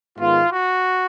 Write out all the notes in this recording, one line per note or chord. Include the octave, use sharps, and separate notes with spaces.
G#2 D#3 G#3 B3 F4
F#4